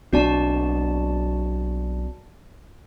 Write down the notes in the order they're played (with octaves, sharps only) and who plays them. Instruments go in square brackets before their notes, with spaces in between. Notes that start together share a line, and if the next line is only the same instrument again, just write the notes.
[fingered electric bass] B1 C4 D4 [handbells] F#4 D5 A5